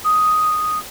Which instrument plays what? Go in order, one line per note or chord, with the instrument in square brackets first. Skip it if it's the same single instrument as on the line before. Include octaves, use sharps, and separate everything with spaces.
[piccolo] D#6